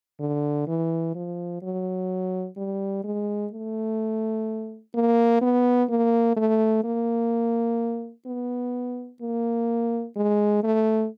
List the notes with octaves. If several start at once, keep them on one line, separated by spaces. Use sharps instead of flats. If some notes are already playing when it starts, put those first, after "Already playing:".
D3
E3
F3
F#3
G3
G#3
A3
A#3
B3
A#3
A3
A#3
B3
A#3
G#3
A3